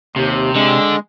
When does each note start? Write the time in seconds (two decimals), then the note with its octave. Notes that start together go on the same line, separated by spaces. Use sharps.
0.16 D#2 C3
0.55 D3 G#3